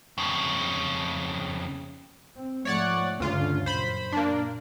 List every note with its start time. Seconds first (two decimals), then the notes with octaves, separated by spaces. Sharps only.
0.18 F2 C#3
2.36 C4
2.65 G#2 F3 A3 C#5 D5 F#5
3.20 D2 G2 C#3 C#4 F4
3.66 F#2 A#2 C5 B5
4.12 A#3 D4